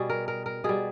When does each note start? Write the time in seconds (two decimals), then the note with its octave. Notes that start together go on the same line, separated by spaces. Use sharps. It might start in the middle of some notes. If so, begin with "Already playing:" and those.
Already playing: B2 G3 G#4
0.10 A#4
0.28 A#4
0.46 A#4
0.64 B2 G3 G#4